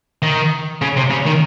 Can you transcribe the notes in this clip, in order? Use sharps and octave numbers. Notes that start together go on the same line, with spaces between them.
D#3
C#3
C3
C#3
D#3